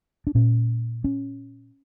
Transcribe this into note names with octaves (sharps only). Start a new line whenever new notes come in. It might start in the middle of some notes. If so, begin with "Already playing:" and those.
D4
A#2 C#4
C#4